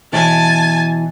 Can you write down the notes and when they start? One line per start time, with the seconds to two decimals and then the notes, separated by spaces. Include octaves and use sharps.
0.12 B2 E3 C#5 G#5 A5